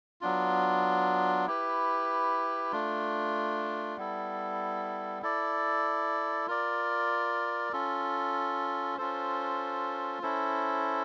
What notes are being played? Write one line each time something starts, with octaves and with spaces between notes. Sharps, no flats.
F#3 B3 D4 F4
E4 G4 B4
A3 D4 F4
G3 B3 E4 A4
E4 A4 D5
F4 A#4 D5
C#4 F4 A4
C#4 F4 A4 C5
C#4 E4 A4 C5